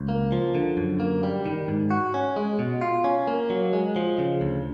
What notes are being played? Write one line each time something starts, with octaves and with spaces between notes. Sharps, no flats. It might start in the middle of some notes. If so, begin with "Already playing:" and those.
Already playing: C#2
A#3
F3
D3
F#2
A#3
G3
D#3
G#2
F#4
C#4
G#3
B2
F4
C#4
A#3
F#3
G#3
F3
C#3
D2